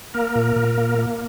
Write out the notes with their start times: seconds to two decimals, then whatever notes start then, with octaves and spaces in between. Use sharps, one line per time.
0.14 A#3 A#4
0.35 A#2
0.56 A#2
0.78 A#3
0.99 A#3